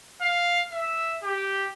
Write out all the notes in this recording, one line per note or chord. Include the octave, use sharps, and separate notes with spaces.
F5
E5
G4